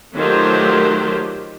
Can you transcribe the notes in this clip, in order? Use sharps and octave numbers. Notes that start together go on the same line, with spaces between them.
D#3 F#3 A3 F4 G4 C5